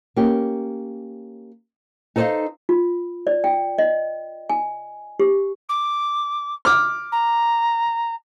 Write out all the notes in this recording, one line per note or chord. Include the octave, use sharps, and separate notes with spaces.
A#3 C#4 G4
D#4 A4 C5 D5 D#5 F5
F4
D5
G5
D#5
G#5
G4
D6
D6 F6
A#5